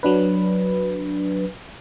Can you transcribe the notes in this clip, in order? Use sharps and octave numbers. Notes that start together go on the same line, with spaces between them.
F#3 D4 B4